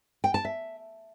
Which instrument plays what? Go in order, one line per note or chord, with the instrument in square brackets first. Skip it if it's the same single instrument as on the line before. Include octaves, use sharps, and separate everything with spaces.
[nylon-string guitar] G5
A5
E5